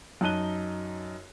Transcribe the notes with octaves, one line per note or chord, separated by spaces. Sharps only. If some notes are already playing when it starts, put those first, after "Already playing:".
F#2 D#4 A5 F#6 D#7 G7